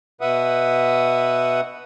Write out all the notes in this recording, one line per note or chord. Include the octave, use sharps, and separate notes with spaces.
B2 B4 E5 F#5 D#6